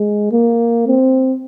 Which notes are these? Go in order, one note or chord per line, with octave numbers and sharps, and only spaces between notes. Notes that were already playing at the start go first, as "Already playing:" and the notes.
Already playing: G#3
A#3
C4